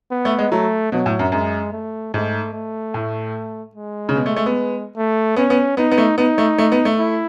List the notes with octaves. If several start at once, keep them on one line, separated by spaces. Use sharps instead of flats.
B3
A3
G#3
F#3 A3
B2 F#3
A2
F#2
F#2 G#3
A3
G#2 A3
A3
A2
G#3
C#3
B2
A3
A3
B3
A3
B3 C#4
B3
B3 D#4
B3
A3
B3 D#4
A3
A3
B3
A3
E4